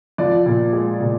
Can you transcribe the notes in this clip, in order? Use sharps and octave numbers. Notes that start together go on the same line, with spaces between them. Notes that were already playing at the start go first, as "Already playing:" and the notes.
F3 D5
A#2
G#3
A#2